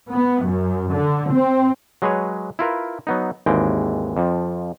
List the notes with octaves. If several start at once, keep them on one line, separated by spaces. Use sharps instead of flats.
B3
F#2
D3
C4
F#3 G#3 G#4 B4 C#5
E4 F4 A#4 B4
F#3 B3 D#4
G#1 D#2 E3 G#3 G5
F2 F3